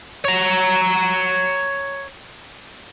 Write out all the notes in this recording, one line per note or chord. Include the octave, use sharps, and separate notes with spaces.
C#5 A#5